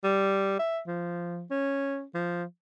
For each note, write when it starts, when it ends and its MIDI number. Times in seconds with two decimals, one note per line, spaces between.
0.04 0.59 55
0.59 0.80 76
0.87 1.45 53
1.51 2.04 61
2.14 2.44 53